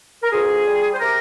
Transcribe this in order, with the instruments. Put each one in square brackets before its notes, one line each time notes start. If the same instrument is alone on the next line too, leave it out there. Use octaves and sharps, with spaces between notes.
[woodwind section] A#4
D2 F4 G#4
G3
C5
C3 G4 A#4